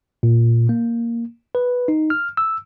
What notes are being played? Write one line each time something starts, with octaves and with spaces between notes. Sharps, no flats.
A#2
A#3
B4
D#4
F6
E6